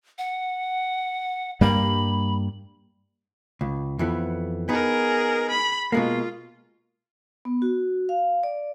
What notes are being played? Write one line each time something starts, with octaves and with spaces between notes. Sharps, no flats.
F#5
G2 G3 A#3 B5
C#2
F2 E3 B3
B3 D#4 G#4 A#4
B5
B2 G#3 A#3 F4
B3
F#4
F5
D5